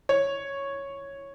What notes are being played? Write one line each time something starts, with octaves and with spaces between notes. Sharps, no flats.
C#5